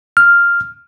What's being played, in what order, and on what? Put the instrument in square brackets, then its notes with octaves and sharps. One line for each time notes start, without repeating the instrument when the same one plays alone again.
[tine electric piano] F6